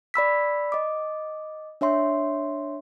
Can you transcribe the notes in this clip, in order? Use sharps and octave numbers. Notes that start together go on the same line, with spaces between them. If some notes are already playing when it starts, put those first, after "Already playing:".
D5 B5 E6 B6
D#5 D6
D4 C#5 E5 C6